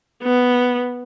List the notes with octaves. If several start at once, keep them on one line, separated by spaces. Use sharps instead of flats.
B3